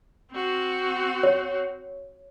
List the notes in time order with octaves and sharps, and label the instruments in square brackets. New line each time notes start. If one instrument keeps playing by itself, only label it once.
[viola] C4 F#4
[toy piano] C#5